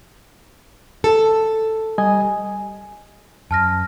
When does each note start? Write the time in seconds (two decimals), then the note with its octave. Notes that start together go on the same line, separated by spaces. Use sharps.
1.04 A4
1.98 G3 D#5 G#5
3.51 F#2 A5 F6 A#6